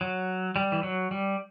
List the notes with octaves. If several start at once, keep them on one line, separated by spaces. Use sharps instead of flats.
F#3
G3
E3
F#3
G3